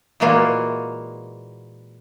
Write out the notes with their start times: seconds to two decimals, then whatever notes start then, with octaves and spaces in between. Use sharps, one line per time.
0.20 A#2 E3 G#3 A#3 F4 F#4